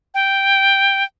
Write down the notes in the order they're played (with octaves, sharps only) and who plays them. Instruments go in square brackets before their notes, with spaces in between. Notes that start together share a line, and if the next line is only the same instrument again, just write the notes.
[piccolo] G5